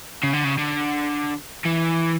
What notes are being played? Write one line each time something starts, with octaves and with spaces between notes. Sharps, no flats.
C#3
D3
C#3
D3
E3